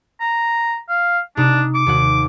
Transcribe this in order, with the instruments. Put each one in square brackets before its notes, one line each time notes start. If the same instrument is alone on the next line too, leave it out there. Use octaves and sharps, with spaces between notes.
[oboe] A#5
F5
[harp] C3 D#4 G4 [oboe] D4
[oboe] D6 [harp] C#7
[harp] D#2 F#4 F#5